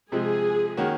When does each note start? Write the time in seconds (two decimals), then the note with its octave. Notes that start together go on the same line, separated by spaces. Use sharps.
0.12 C3 F3 G#3 G#4
0.77 D#3 A#3 C#4 F#4